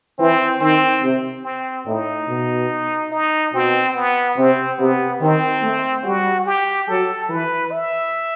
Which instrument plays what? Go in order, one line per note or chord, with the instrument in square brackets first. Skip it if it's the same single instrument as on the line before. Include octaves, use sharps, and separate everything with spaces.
[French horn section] E3 [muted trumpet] C4
[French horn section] D#3 [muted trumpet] C4
[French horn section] C3
[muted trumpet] C4
[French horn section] A2 [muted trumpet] D#4
[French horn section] B2
[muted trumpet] D#4
[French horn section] B2 [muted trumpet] C4
[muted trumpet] B3
[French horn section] C3 [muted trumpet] C4
[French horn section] C3 [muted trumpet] B3
[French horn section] D#3 [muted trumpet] C4
[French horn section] A3
[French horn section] G3 [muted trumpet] F#4
[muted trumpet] G4
[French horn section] F#3 [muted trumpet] A4
[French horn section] E3 [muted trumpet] B4
[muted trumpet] E5